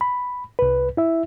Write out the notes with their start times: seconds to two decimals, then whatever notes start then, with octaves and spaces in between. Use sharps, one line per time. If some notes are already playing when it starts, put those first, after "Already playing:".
0.01 B5
0.59 C2 B4
0.97 E4 E5